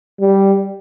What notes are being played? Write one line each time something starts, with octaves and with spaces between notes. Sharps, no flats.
G3